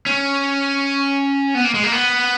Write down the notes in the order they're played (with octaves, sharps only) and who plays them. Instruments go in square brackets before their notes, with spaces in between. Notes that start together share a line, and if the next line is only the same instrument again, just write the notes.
[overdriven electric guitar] C#4
B3
A#3
G#3
A#3
B3